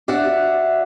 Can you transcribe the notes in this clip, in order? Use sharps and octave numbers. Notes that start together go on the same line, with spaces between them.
D4 F#4 D5 E5 F#5